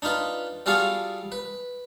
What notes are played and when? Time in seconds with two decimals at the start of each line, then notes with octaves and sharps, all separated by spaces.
0.02 D4 D#4 F4 B4
0.66 G3 F4 F#4 G#4 A4 F5
1.32 B4